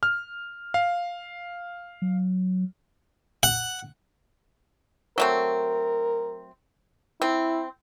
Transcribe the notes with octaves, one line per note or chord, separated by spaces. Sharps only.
F6
F5
F#3
F#5
F#3 A3 C4 A#4
C4 E4